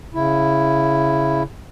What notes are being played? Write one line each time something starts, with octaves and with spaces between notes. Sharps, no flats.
C#3 E4